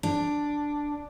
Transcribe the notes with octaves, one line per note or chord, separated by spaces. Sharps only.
D4